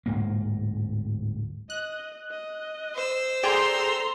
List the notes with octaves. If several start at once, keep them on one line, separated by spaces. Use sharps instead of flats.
D1 G#2 A#3
D#5 F#6
D#5
C5 E6
G#4 A4 D5 G5 A#5 C6